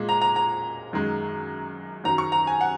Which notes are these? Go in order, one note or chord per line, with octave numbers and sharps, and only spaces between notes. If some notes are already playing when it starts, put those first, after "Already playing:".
Already playing: A#2 G#3
A#5
A#5
A#5
F#2 D#3 G#3
F#2 D#3 F#3 A#5
C#6
A#5
G#5
F#5